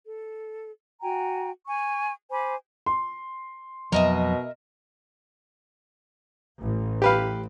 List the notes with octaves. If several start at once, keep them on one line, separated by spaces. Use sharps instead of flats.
A4
F#4 G5 G#5 A#5
G#5 C#6
C5 G#5 B5 D6
C6
F2 B2 F#3 A#4 D#5 E5
A1
G4 B4 F5